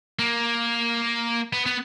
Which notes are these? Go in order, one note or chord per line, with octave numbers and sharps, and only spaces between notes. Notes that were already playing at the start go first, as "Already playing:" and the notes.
A#3
B3
B3